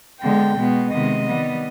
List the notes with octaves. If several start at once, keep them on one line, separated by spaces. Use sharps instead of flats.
D3 G#3 B3 G5
B2 G#3 B3
C3 D#3 G#3 B3 D#5
D#3 G3 B3